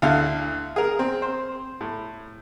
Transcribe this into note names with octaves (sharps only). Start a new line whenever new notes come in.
D2 D3 E4 F5
G#4 A#4
C4
C5
A2